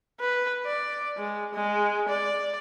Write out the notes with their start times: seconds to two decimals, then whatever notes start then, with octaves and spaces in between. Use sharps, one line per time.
0.20 B4
0.66 D5
1.17 G#3
1.54 G#3
2.09 D5